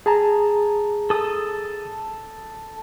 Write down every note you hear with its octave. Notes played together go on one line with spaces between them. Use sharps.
G#4 A5 A#5
A4 D#6